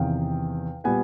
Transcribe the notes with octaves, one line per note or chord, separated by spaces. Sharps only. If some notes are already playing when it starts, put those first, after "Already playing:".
Already playing: E2 C3 D#3 F5 G5
A#2 G3 B3 F#5 G#5